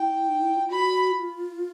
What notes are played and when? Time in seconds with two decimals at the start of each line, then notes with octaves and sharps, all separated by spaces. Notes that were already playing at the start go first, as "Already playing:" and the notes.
Already playing: E4 G5
0.28 D#4
0.42 E4
0.56 F4
0.70 F#4 B5
1.11 F4